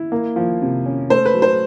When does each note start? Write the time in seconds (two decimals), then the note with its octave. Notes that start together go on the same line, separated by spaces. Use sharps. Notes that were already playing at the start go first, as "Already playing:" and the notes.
Already playing: E4
0.12 A#3
0.36 F3
0.61 C3
0.86 C#4
1.10 A3 C5
1.25 B4
1.34 F#3
1.42 C5